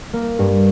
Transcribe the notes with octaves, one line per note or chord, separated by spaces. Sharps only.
A#3
G2